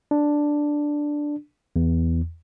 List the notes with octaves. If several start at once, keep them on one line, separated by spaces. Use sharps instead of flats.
D4
E2